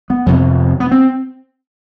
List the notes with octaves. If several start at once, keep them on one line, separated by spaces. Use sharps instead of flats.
B3
F2 C3
B3
C4